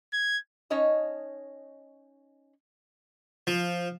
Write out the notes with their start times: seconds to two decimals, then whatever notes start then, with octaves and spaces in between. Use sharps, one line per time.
0.13 G#6
0.70 C#4 D#4 C#5 D#5 A5
3.47 F3